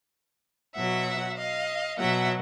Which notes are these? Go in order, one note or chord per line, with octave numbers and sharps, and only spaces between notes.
B2 F#3 E5 F#5
D#5 F5
B2 F#3 E5 F#5